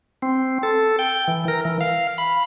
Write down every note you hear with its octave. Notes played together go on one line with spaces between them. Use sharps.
C4
A4
G5
E3
A#4
E3
F5
B5